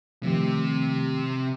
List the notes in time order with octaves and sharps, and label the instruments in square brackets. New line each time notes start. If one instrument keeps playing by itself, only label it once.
[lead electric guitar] C3 G4 [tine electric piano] D#3 F3 A3